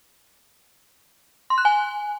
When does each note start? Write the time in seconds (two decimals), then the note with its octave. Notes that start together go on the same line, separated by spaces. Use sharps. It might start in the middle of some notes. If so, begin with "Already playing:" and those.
1.50 C6
1.58 F#6
1.65 G#5